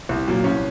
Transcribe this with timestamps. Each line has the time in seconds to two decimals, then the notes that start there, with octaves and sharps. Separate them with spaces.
0.09 C2
0.27 A#2 F#3 A#3
0.44 C2 C#4